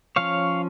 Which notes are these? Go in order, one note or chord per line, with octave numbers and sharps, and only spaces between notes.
F3 C#4 C#5 F5